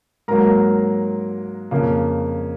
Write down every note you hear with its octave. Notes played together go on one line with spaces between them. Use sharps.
G#2 F#3 A#3 A#4 A#5
F2 C#3 F3 A#3